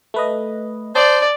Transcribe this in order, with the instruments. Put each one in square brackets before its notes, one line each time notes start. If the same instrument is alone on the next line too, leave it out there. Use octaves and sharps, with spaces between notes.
[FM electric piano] A3 B4 D#5
[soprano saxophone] C5 [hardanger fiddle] D5 [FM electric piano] A5 D#6